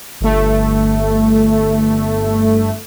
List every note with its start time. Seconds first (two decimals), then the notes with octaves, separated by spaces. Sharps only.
0.21 G1 A3